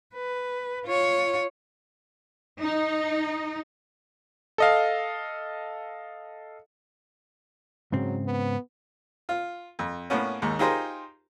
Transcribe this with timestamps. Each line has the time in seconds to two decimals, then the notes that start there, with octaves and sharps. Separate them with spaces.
0.14 B4
0.87 F4 C#5
2.61 D#4
4.58 A4 D#5 F5
7.92 G#2 C#3 F#3 C4
8.26 B3
9.29 F4
9.79 F2
10.10 A2 A#3 B3 C#4
10.42 D#2 G#2
10.59 D#4 F4 G4 G#4 A#4 C5